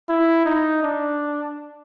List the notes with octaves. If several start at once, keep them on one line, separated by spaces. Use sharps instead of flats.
E4
D#4
D4